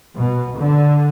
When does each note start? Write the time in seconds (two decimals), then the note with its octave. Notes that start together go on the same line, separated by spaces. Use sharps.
0.16 B2
0.58 D3